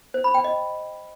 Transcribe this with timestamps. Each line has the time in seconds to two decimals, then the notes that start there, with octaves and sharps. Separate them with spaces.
0.14 C5
0.24 B5
0.34 G5
0.44 D#5